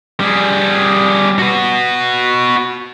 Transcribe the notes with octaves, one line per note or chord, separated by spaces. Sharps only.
G3 G#4
F#4 B4